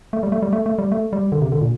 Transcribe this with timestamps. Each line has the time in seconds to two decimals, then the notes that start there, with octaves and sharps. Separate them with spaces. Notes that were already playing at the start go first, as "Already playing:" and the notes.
0.13 A3
0.23 G3
0.32 A3
0.42 G3
0.53 A3
0.66 A3
0.78 G3
0.92 A3
1.13 G3
1.32 D3
1.42 C3
1.52 D3
1.61 A#2